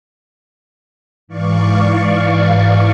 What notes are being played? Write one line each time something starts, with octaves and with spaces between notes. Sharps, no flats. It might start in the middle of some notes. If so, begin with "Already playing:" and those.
G#2 E3 D5 F5 C#6